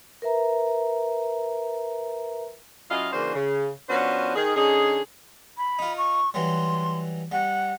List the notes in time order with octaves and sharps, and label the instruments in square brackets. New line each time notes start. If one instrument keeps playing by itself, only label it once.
[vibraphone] A#4 B4 E5 A#5
[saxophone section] F#3 C#4 E4 F4 D#5 F5
C#3 E3 A#3 D4 F#4 C5
C#3
F3 B3 C#4 D4 F#4 C5
D#3 G#4
D3 C#4 D#4 G#4
[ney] B5
[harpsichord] D#4 F4
[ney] C#6
[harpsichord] E3 F#3 G3 [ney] C6
[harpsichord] G3 [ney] F#5